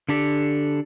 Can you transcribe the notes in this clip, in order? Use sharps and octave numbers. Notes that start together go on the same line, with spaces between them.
D3 D4 G4 A4